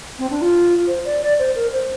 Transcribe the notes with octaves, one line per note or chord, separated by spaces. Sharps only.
C4
D4
F4
C5
D5
D5
C5
A#4
C5